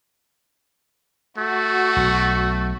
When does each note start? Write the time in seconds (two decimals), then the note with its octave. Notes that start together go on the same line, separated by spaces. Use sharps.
1.38 A3 F#4
1.96 B1